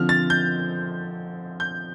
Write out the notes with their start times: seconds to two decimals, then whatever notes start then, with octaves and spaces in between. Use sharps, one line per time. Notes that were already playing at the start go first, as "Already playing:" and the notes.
Already playing: D3 F3 C4 F6
0.09 A6
0.30 G6
1.60 G6